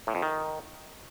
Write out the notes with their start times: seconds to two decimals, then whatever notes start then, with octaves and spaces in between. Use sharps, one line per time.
0.07 A2
0.15 F2
0.22 D#3